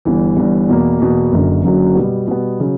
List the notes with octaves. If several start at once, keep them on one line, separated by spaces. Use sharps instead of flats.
G1 G2 E3
G1 G2 E3
E2 B2 A#3
E2 B2 A#3
F#1 F#2 D3 F#3
F#1 F#2 D3 F#3
B2 G3 B3
B2 G3 B3
C#3 F#3 C#4